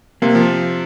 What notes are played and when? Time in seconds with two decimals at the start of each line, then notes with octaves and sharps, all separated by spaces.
0.22 C3 A#3
0.35 F3